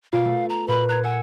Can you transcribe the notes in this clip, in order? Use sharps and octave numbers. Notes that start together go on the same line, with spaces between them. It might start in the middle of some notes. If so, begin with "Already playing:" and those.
B2 F4 F5 D7
A3
A#5
A#2 B4 B5
A#5 F#6 G#6
F#5 G#5 E6 C#7